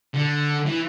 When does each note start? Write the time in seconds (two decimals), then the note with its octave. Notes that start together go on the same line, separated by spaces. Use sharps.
0.14 D3
0.67 E3